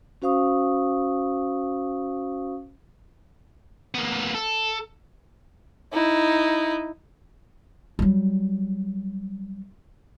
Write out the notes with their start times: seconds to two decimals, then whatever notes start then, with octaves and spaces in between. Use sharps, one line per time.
0.22 C#4 F#4 C5 F5 C#6 D#6
3.94 A#3 B3
4.35 A4
5.93 D#4 E4
7.99 F#3 G3